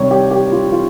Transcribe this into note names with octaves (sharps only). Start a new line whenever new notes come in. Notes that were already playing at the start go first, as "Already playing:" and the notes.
Already playing: C3 D#3 G3 C#5
G4
G4
F4
F4